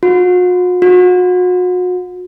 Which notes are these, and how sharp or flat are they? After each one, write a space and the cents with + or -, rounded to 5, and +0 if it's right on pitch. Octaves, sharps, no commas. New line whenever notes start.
F#4 -45
F#4 -35